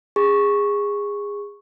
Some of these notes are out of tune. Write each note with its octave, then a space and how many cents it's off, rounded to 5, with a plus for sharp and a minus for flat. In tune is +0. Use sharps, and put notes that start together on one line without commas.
G#4 -20 C#6 -5